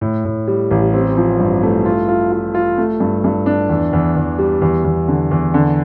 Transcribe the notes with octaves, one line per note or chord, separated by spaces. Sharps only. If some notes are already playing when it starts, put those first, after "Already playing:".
A2
A2
G3
A1
C4
F3
G2
A3
F4
F4
F4
F4
A3
G2
G2
D4
E2
E2
E2
G3
E2
E2
D3
E2
D3